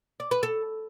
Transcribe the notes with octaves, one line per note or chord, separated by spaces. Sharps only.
D5
B4
A4